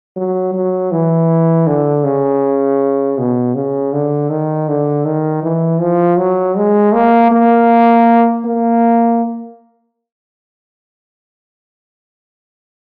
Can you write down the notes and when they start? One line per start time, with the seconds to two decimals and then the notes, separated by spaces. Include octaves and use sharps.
0.16 F#3
0.54 F#3
0.92 E3
1.67 D3
2.04 C#3
3.18 B2
3.55 C#3
3.93 D3
4.30 D#3
4.68 D3
5.05 D#3
5.43 E3
5.80 F3
6.18 F#3
6.57 G#3
6.93 A#3
7.32 A#3
8.45 A#3